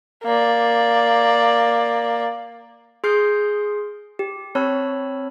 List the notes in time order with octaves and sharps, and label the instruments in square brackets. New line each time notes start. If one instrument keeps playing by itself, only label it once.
[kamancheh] A#3 D5
[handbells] G#4 C6 D#6 F6 G6 C7
G4
C4 C#5 A5 B5 E6 F6